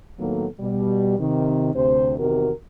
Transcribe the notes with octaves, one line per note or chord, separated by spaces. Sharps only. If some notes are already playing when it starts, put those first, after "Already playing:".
A2 D#3 F#3 A#3 B3 A4
B2 G3
C3 D#3
D2 C3 C5
E2 C3 D#3 F#4 A#4